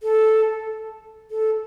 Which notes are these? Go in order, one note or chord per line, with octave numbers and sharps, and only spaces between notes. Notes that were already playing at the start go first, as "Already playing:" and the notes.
A4
A4